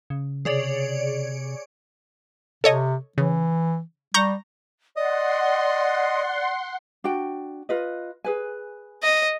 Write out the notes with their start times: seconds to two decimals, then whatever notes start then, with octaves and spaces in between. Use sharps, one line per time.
0.10 C#3
0.45 C3 G#4 C#5 D5
2.64 C3 A4 C#5 D#5
3.18 C#3 E3
4.14 G3 A#5 C#6 G6
4.96 D5 D#5 F#5 C6
7.04 D4 F#4 G5
7.69 F4 B4 D#5
8.24 G#4 B4 G#5
9.03 D#5